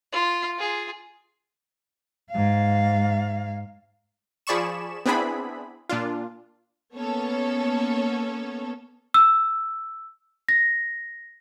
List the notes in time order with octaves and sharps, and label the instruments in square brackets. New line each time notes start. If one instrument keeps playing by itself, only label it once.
[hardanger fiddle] F4
F4 G#4
[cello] G#2 F5
[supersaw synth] F3 G#4 D5 B5 C#6 E7
B3 C4 D4 E4 G#4 B5
A#2 D4 F4
[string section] A#3 B3 C#4 A4 C#5
[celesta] E6
A#6